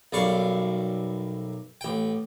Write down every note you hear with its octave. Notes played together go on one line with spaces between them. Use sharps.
B1 F#2 G3 F5 C#6
A1 G5